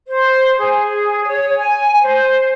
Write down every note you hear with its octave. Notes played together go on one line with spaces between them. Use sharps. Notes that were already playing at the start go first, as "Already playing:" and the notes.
C5
G#4
C#5
G#5
C5